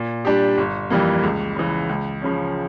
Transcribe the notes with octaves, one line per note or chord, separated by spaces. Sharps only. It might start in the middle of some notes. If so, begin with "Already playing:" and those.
Already playing: A#2
G3 D4 G4
G1
F2 E3 G3 A#3
C#2
C#3 E3
C#2
C#3 F3 C#4